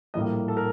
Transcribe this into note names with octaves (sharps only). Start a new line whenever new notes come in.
A#1 A2 G3 A#3 D#5
A4
A#4